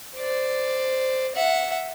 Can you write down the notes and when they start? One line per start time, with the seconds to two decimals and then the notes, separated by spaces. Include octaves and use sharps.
0.17 C5 D5
1.35 E5 F#5